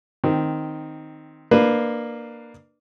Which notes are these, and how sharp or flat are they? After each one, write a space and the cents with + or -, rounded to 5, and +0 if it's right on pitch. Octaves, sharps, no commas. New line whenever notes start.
D#3 +0 C4 +0
A#3 +0 D4 +25 B4 +0